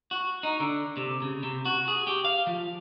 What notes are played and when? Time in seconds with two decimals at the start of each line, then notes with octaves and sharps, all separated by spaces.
0.11 F#4
0.43 D#4
0.60 D3
0.97 C3
1.22 C#3
1.43 C3
1.65 F#4
1.88 G#4
2.07 G4
2.25 F5
2.47 F3